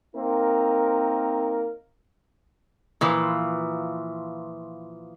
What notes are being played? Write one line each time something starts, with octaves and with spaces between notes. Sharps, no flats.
A#3 C4 D#4 A#4
A#2 E3 F3